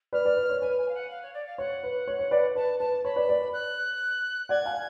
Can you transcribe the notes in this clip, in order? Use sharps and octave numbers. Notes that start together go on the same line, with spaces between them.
B4 D5 F6
B4 D5
B4
C#5
B4 G#5
G#5
F5
F#5
F5
C#5
D5
F5
C#5 F#5
B4
C#5
C#5
B4 D5
B4 A5
B4 A5
C#5 B5
B4 D5
B4 D5
F#6
D5 F#5 G#6
F5 G#5